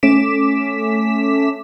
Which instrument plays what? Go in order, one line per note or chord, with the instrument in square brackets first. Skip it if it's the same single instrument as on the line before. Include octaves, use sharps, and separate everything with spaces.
[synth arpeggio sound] A3 C#4 D6 B6 E7